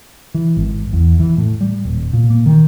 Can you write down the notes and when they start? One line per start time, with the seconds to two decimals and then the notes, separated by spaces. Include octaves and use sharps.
0.34 E3
0.57 G#1
0.93 E2
1.20 E3
1.38 A2
1.61 G3
1.85 D#1
2.13 A#2
2.30 A#3
2.46 D#3